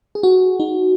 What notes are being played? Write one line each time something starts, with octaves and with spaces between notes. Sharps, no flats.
G#4
F#4
D#4